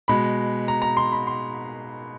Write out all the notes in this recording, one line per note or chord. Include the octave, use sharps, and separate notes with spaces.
B2 G#3 B5
A#5
A#5
C6
B5
C6